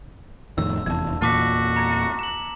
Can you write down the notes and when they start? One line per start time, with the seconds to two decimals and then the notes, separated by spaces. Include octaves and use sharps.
0.58 F2 A2 D#3 E6
0.86 F1 E2 A5 G#6
1.22 E2 A#2 A#3 F#4 A5 D6 B6
1.76 A#5 G#6 C#7
2.19 E7 F#7